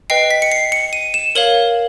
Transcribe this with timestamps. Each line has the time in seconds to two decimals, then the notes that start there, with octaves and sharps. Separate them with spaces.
0.10 B4 D#5 G5 C7
0.31 B6
0.42 C#7
0.52 C7
0.72 C#7
0.93 D#7
1.14 E7
1.35 A#4 C#5 F5 F#7